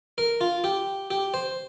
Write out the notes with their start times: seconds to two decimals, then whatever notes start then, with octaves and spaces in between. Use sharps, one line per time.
0.18 A#4
0.41 F4
0.64 G4
1.10 G4
1.34 C5